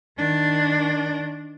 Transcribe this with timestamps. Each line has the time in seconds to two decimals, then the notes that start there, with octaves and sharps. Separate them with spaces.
0.17 D#3 D4